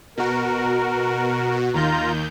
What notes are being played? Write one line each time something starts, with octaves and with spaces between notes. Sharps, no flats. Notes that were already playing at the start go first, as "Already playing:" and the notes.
B2 F#4 A#4
D#2 D#3 F4 A#5 G6